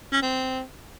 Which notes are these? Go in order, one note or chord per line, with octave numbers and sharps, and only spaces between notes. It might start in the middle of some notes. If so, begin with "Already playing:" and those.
C#4
C4